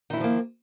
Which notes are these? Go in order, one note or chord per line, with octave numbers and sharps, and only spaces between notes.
D#3 F3 F#3 A#3 E4